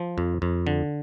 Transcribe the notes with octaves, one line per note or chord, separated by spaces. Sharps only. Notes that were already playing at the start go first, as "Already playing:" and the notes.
Already playing: F3
F2
F2
D3